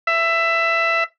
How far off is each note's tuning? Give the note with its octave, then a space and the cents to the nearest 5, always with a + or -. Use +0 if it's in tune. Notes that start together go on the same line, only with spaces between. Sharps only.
E5 +15